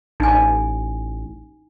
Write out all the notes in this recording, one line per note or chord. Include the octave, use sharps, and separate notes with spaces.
A1 D#4 G#5